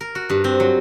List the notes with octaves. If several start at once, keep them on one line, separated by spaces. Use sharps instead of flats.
A#4
F#4
G2
C4
F#3